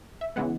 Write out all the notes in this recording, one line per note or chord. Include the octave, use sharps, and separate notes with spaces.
E5
C#3 E3 G#3 B3 F#5